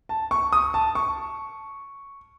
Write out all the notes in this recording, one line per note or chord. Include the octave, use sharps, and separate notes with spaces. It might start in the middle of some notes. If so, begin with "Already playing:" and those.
A5
C#6
D#6
A5
C#6